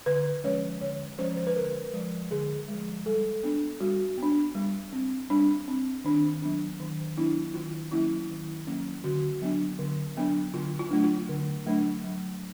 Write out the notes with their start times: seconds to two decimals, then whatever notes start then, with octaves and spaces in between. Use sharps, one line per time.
0.06 D3 B4
0.44 F3 G#3 C#4 C#5
0.81 D3 C#5
1.19 F3 G#3 C#4 C5
1.37 C5
1.47 B4
1.56 D3 A#4
1.93 F3 G#3
2.31 D3 G#4
2.68 F3 G#3
3.06 G3 A4
3.43 B3 D4
3.80 G3 F#4
4.18 B3
4.23 D4
4.55 G3
4.93 C4
5.30 G3 D4
5.68 C4
6.04 D#3 D4
6.42 F#3 B3 D4
6.80 D#3
7.17 F#3 B3 D4 E4
7.54 D#3 F4
7.92 F#3 A#3 C#4 E4
8.29 D#3
8.67 F#3 A#3 C#4
9.04 D3 F#4
9.42 F#3 B3 D4
9.79 D3
10.16 F#3 B3 D4
10.54 D3 F4
10.79 F4
10.91 F#3 A3 D4
11.04 F4
11.29 D3
11.66 F#3 A3 D4
12.04 F#3